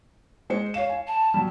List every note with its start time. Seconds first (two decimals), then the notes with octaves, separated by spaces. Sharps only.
0.50 G#3 C5 C#7
0.74 C#5 F5 E7
0.89 G#5
1.07 A5
1.34 F#3 G3